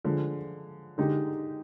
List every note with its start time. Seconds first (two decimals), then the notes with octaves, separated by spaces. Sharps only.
0.05 D3 F3 G#3
0.98 D3 G#3 D#4 G4